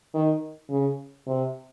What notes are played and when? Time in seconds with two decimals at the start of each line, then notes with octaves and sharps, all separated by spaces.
0.14 D#3
0.70 C#3
1.27 C3